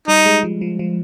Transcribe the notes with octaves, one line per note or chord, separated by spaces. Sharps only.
G3 D#4
G#3
F3
F3
F3